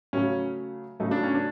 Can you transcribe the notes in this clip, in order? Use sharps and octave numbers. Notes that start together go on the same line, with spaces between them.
C#3 F#3 A3 C#4
C#3 F#3 A3 D#4
D4
C#4
D4